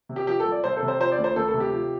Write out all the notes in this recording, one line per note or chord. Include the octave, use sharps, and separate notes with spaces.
C3
G4
F3 G4
A4
C2
D5
C2 C5
A4
C3
C5
F3 C5
D5
D2
C5
D2 A4
A4
C3
G4
F3